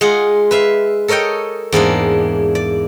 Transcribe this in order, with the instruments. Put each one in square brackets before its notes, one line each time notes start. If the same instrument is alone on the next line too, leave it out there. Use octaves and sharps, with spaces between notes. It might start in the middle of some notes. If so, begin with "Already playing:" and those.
[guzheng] G#3 F4 G#4 F#5
B4 E5 F5
A4 A#4 C#5 D#5 G5
E2 G#2 A#3 D4
D5